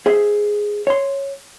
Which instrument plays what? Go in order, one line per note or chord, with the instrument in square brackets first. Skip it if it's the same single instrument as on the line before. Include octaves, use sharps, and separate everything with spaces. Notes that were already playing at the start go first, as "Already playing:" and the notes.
[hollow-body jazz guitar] G#4 C5 E5
C#5 C6